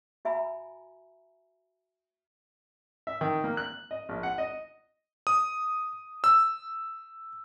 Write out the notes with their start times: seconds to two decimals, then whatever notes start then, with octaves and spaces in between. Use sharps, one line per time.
0.25 F#4 E5 G#5 A#5 B5
3.07 E5
3.21 D#3
3.44 A#3
3.57 F#6
3.91 D#5
4.09 A#1
4.23 F#5
4.38 D#5
5.27 D#6
6.24 E6